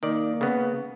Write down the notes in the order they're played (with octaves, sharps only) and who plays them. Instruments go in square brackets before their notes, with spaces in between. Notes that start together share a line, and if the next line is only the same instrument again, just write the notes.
[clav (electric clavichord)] D#3 D5 [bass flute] A#3
[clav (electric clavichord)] C#3 B3